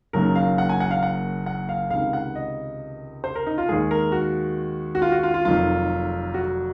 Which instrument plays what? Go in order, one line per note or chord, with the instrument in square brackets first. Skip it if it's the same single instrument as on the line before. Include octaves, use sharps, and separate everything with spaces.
[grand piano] F#1 F#2 D#3 F#3 A#3 A#4
F5
F#5
G#5
F#5
F5
F#5
F#5
F5
C#2 C3 D#3 F5
F#5
D#5
C5
A#4
D#4
F4
D#2 D#3 G#3 G#4
A#4
F#4
F#4
F4
F#4
F4
F4
F1 F2 D#3 F#3 F4
F#4